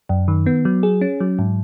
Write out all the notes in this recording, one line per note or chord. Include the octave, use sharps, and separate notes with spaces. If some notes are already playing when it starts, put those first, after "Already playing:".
F#2
D#3
B3
F#3
G#4
C#4
F#3
G#2